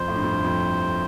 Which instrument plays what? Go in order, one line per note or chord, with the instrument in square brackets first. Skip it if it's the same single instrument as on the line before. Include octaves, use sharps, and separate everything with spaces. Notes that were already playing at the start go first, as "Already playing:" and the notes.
Already playing: [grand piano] F2 [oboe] C5
[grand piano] A2
G2
F2
G2
F2